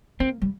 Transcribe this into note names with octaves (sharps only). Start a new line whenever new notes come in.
A#3 C4
G3